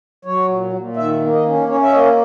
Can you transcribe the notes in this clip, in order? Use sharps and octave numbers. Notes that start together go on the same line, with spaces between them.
F#3 C#5
A#2
A#2
D#3 E5
A#3
D#5
C#4
C#4 C#5
E5
A#3 D#5